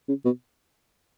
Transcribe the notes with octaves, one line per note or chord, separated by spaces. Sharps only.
C#3
B2